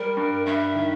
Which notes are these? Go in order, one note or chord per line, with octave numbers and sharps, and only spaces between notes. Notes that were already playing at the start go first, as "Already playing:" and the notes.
Already playing: G3 A#4
G2
G2 E5
D#3